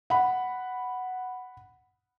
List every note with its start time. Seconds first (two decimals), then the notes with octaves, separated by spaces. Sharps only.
0.10 F#5 B5